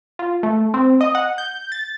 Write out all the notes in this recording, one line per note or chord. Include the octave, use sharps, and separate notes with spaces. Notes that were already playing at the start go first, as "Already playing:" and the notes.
F4
A3
C4
D#5
F#5
G6
A6